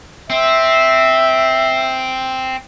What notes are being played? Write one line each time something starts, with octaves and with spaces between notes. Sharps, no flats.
C4 E5